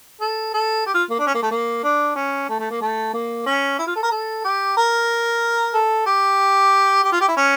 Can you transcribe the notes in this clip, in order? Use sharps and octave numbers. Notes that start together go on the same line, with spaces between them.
A4
A4
G4
F4
A#3
D4
C#4
A#3
A3
A#3
D4
C#4
A3
A3
A#3
A3
A#3
C#4
E4
F4
A4
A#4
A4
G4
A#4
A4
G4
G4
F4
G4
E4
C#4